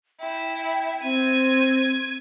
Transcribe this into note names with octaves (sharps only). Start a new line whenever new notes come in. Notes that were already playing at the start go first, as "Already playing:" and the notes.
E4 G5
C4 G#6 D#7